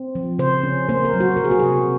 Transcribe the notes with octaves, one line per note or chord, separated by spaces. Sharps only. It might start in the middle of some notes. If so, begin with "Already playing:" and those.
Already playing: C4
F3
C#3 C5
C#4
A#3 C5
A#4
F#3
F#4
C3 A#4
G#4
F#4
C3 G#4